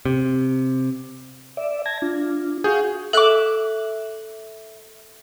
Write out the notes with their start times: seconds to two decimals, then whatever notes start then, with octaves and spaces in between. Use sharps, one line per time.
0.05 C3
1.57 D5 E5
1.86 A5 G#6 A#6
2.02 D4 F4
2.64 F#4 G#4 F5 G6
3.13 A4 E5 D6 F#6 F#7